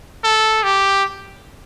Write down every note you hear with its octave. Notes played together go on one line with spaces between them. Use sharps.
A4
G4